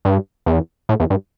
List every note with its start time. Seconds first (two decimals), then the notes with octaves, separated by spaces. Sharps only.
0.05 G2
0.46 E2
0.89 A2
1.00 E2
1.10 G2